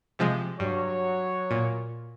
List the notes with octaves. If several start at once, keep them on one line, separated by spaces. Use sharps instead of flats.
C3 F3 G#3
G2 F#3 C#5
A#2